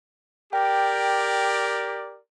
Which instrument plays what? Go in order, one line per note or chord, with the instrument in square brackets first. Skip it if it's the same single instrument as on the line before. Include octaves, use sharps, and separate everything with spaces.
[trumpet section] G4 A#4 D5 [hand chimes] G5